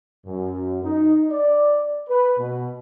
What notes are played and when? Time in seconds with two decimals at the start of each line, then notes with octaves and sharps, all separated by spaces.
0.27 F#2
0.84 D#4
1.32 D5
2.09 B4
2.39 B2